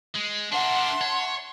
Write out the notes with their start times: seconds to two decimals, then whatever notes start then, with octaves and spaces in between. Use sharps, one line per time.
0.14 G#3
0.52 D4 A#4 E5 F#5 A5 C6
1.01 C#5